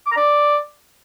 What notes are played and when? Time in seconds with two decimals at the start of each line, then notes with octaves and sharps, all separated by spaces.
0.06 D6
0.11 A#5
0.17 D5